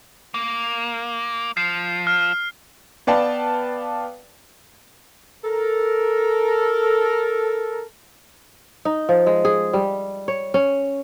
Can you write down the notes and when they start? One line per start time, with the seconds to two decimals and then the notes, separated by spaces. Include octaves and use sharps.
0.34 A#3
1.57 F3 C7
2.07 F6
3.07 B3 B4 D5 F5 G5 A5
5.44 A4 A#4
8.85 D#4
9.09 F3
9.26 G#3
9.45 G#4
9.73 G3
10.28 C#5
10.54 C#4